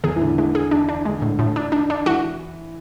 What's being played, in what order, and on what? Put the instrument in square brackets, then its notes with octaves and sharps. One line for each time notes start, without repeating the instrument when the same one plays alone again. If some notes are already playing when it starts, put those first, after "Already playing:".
[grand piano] E2 [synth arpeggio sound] G#4
[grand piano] E3
[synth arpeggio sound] A2 [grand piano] D3
[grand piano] E3 [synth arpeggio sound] G#3
[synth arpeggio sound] G#4
D4
D4
[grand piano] D3 [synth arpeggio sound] G#3
[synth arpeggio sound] A2
A2
D4
D4
D4
[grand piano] E3 [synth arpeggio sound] F#4